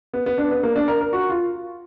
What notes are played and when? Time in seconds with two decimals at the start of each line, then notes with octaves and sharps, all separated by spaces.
0.13 B3
0.26 B3
0.38 D4
0.51 B3
0.63 A#3
0.76 D4
0.88 A#4
1.01 A#4
1.13 F#4
1.30 F4